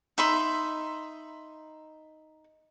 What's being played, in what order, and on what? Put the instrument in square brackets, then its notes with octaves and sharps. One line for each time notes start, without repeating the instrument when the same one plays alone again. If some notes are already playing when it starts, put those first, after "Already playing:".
[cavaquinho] D#4 E5 B5 C6